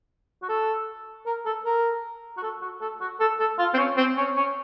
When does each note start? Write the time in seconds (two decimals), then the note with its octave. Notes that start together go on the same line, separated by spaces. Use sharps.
0.42 F#4
0.49 A4
1.26 A#4
1.46 A4
1.65 A#4
2.37 F#4
2.43 A4
2.62 F#4
2.81 A4
3.01 F#4
3.20 A4
3.40 A4
3.59 F4
3.74 C4
3.78 C#4
3.97 C4
4.17 C#4
4.37 C#4